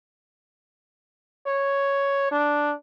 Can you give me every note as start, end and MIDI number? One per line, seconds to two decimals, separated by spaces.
1.47 2.31 73
2.31 2.73 62